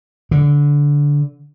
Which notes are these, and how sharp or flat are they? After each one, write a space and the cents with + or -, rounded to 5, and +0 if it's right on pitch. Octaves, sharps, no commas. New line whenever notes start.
D3 -15